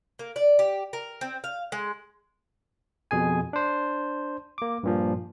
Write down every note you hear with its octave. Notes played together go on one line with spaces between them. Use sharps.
A#3
D5
G4
A#4
C4
F5
G#3
F2 B2 G#4 G#5
D4 C5
A#3 D6
G2 A#2 F3